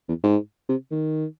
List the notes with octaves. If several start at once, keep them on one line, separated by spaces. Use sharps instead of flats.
E2
G#2
C3
D#3